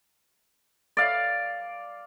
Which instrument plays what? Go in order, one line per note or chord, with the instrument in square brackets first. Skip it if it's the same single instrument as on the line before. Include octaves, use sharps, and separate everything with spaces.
[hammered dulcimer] D5 F5